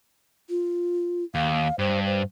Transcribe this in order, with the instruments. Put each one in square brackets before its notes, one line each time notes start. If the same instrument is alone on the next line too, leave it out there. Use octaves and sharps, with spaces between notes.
[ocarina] F4
[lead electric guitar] D#2 [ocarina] F5
[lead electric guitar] G2 [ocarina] C5
[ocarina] C5